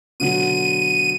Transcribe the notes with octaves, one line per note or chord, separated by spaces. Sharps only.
B2 D3 F#3 D#7